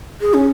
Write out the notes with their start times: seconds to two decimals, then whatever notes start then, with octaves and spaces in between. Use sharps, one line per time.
0.21 G#4
0.34 C#4